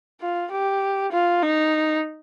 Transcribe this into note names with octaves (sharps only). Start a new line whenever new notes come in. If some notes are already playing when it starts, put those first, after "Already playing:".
F4
G4
F4
D#4